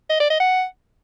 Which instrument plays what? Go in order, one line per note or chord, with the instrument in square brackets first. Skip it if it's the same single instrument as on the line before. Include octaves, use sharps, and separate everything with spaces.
[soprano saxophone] D#5
D5
D#5
F#5